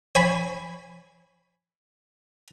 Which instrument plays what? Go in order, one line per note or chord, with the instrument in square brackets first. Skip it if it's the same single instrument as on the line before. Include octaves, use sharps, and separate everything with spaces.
[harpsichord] C#5 G#5 B5